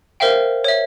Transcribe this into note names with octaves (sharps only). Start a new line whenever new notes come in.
A#4 C5 E5 F5 G5
C#5 E5